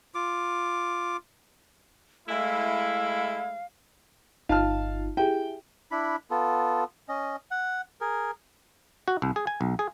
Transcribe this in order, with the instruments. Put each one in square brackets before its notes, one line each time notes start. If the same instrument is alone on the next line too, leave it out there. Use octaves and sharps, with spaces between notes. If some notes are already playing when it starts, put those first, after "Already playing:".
[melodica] F4 D6
[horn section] G#3 A3 E4 [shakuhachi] F5
[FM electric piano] G1 D#4 F4 [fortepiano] F5 A5 F6
[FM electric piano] E4 G4 G#4 [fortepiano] G5
[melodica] D4 E4 B5
B3 F4 A4
C#4 D#5
F#5
G#4 A#4
[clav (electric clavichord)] F#4
C2
G#4
G#5
B1
G#4